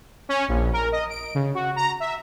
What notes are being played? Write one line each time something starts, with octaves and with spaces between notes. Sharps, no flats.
C#4
A#1
A#4
D#5
D7
C#3
F#4
A#5
E5